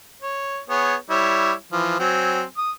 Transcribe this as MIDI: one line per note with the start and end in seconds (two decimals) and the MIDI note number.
0.22 0.59 73
0.70 0.95 59
0.70 0.95 68
0.70 0.95 73
1.10 1.52 55
1.10 1.52 64
1.10 1.52 73
1.72 1.97 52
1.72 1.97 53
1.99 2.43 54
1.99 2.43 60
1.99 2.43 80
2.57 2.71 87